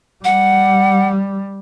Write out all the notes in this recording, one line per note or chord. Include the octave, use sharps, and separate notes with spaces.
G3 F#5